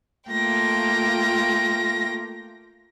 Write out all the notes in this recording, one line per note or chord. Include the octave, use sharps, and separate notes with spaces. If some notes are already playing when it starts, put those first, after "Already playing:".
A3 A#3 F4 G5 A#6